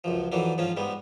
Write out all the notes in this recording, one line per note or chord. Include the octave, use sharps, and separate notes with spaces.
C#2 F#2 F3
F2 E3 F#3 D4
G#2 F3 C#4 F4
G#2 G3 G#3 B3